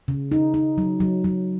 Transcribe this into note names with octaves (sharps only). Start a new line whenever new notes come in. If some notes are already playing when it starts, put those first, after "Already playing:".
C#3
D#4
D#4
F#3
F#3
F#3